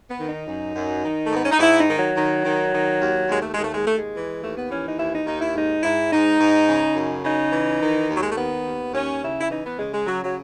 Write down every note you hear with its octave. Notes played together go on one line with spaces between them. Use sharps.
B3
D#3
D#4
F#2
F#2
D#3
A3
G#2 B3
C#4
D#4
G#2 E4
D#4
D#3
F#3
D#3
D#3
D#3
D#2
D#2 G#3
A3
D#2 G#3
A3
G#3
D#2 A3
G#3
E3
D#2 A3
B3
E3 C#4
D#4
D#2 E4
D#4
D#2 D#4
E4
G#2 D#4
G#2 E4
G#2 D#4
G#2
C#3
F#2
C#3 D#4
E3
D#3
D#2
F#3
G#3
A3
D#3 B3
D#2
D#2 C#4
C#3 E4
E4
E3 D#4
B3
C#3 G#3
G#3
C#3 F#3
F#3